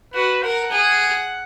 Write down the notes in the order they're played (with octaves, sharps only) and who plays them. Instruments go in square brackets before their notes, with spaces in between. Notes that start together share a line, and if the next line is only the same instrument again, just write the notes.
[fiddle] F#4 [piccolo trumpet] B4
[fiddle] A#4 [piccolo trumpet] F#5
[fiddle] G#4